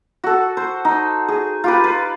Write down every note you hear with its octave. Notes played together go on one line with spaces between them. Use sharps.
F#4 A4
C5
D#4
G#4
F4 G4 B4
B4